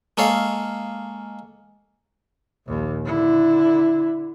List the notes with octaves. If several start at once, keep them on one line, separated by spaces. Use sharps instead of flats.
G#3 A#3 A4 C#5 F5
A#1 D#2
D3 E4